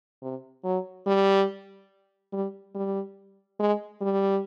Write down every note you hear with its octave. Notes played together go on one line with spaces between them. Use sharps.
C3
F#3
G3
G3
G3
G#3
G3